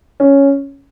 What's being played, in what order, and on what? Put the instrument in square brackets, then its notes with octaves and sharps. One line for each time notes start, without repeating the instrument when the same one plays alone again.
[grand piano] C#4